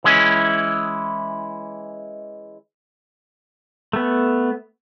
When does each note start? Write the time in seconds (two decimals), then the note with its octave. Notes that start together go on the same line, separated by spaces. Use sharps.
0.04 E3 G#3 C#4 E4
3.93 A3 B3